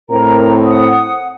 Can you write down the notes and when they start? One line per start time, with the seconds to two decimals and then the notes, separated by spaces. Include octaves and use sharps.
0.10 A2 C4 A#4 A#5
0.65 F#5 D#6